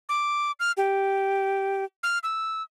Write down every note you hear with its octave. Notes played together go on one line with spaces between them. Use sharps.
D6
F6
G4
F6
E6